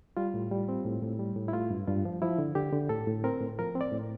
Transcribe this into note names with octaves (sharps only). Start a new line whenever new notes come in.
G3 F4
A2
G3
C4
A2
A2
G3
A2
E4
A3 F4
G2
G2 F4
F3
F3 E4
D3
D3 G4
D3
A2 A4
A2
C4 A#4
A2
F3 A#4
C4
D5
A2